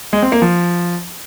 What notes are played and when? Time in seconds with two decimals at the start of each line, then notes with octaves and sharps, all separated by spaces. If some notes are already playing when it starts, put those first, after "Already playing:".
0.13 G#3
0.22 C4
0.32 A#3
0.42 F3